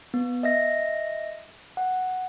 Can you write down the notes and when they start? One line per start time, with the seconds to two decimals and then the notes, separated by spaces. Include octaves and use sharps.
0.14 B3
0.43 D#5 E5 A#6
1.77 F#5